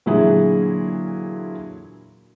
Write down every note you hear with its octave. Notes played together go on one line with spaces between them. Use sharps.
A#2 D3 E3 F#3 E4 G#4